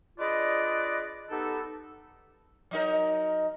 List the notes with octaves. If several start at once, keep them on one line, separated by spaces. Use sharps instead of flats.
D4 F4 G#4 B4 D5 D#5
B3 D#4 G4 A4
F#3 D#4 A#4